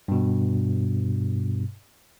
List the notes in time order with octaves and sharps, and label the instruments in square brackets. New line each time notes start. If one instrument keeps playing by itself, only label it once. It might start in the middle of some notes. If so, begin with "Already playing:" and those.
[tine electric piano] G2 B2